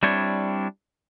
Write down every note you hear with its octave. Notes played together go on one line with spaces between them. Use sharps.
G3 C4 D4 E4 C#5